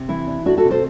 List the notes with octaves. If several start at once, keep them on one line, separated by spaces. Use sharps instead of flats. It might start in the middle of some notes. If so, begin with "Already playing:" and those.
Already playing: C3
E3 E4
D4
A3 D4 F#4
F#4 A4
C3
A4 C5